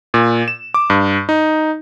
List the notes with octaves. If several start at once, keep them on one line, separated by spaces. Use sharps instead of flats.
A#2
E7
D6
G2
D#4